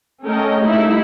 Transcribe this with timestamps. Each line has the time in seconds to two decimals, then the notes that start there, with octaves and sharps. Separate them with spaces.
0.24 A3 C#4 A4 A#4 D#5 G5
0.60 G3 A3 A#3 D#4 E4 B5